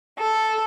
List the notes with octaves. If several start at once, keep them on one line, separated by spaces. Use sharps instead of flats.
A4